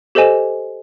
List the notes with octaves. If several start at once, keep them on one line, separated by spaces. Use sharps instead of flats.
G4 A4 C5 D#5 G#5 E7